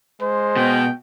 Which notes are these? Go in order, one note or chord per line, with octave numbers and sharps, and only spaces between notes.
G#3 C5
B2 G5